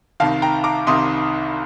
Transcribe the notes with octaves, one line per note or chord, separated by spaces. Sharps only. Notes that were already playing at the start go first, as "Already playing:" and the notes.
C2 C3 D#3 F5 A5
G5 A#5
A#5 D6
C2 C3 D#3 C6 D#6